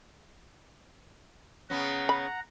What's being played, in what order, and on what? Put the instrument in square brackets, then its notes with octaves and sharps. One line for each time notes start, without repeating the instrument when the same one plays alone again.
[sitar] C#3 B3 C#4 [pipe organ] F#5 A#5
[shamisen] B5